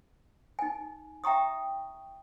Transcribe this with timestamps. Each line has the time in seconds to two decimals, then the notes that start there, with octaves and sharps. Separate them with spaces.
0.59 D#4 G#5
1.24 E5 G5 A#5 C#6 D#6